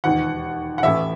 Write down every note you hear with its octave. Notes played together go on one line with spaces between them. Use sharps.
E1 D#2 D#3 F#5
F#5
A1 A2 E3 E5